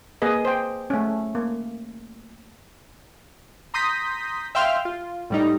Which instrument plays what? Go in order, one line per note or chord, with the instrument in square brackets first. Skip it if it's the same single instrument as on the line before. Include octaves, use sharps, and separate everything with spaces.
[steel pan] A#3 G#4 B4 D#5
C5 G5
A3 C#4
A#3
[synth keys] A#5 C6 D#6 G6 A#6 B6
E5 F5 G5 C6 F6
F4
A2 G3 D#4